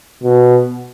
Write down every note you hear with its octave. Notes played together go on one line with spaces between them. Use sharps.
B2